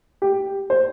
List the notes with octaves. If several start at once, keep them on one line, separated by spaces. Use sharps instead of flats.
G4
C5